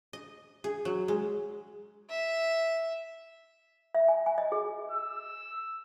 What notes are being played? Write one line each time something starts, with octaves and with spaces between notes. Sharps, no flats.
D#5
G#4
F#3
G#3
E5
E5
G#5
G#5
D#5
G#4
E6